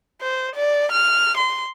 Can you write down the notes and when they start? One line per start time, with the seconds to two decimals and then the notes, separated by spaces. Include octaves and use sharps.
0.22 C5
0.56 D5
0.92 F6
1.37 C6